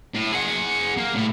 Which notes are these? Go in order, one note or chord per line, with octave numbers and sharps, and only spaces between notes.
A2
G#4 F#5
A#3
A2